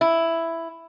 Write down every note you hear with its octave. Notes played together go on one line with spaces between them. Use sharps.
E4